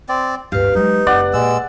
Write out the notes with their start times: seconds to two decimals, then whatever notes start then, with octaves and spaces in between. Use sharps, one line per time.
0.09 C4 D5
0.52 G1 D2 G4 B4 F5
0.75 F#3 G#3 D#4
1.07 F#1 C#4 D5 F#5
1.34 A#2 G#3 E6